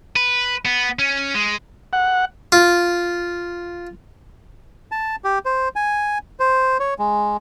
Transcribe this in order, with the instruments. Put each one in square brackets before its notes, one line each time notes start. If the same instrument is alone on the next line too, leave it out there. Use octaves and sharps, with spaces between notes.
[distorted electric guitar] B4
B3
C#4
G#3
[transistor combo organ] F#5
[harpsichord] F4
[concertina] A5
G4
C5
G#5
C5
C#5
G#3